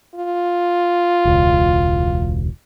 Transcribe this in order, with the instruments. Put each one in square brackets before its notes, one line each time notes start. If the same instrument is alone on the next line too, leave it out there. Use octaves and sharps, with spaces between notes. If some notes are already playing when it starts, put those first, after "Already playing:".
[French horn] F4
[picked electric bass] E1 C#2